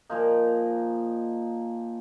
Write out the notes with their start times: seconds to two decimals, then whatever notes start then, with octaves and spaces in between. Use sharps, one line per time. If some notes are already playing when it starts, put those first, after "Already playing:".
0.10 A#2 F3 A#3 D#4